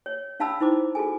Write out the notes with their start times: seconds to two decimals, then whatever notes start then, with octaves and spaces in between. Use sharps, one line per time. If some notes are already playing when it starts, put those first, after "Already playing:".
0.06 C#5
0.40 C#4 D4 F5 A5 B5 E6
0.60 D#4 E4 C5 D6
0.95 F#4 G#4 A4 G#5